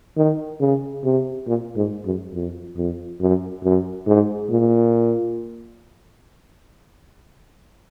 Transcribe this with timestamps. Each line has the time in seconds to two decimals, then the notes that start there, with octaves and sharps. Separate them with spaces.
0.17 D#3
0.60 C#3
1.04 C3
1.47 A#2
1.76 G#2
2.05 F#2
2.34 F2
2.77 F2
3.21 F#2
3.64 F#2
4.07 G#2
4.50 A#2